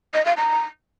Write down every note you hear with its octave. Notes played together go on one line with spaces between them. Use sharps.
D#5
F5
A#5